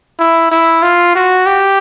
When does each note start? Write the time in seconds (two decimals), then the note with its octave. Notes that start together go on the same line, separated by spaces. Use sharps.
0.19 E4
0.51 E4
0.83 F4
1.15 F#4
1.46 G4